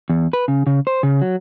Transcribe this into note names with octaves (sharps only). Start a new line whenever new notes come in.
E2
B4
C#3
C#3
C5
C#3
F#3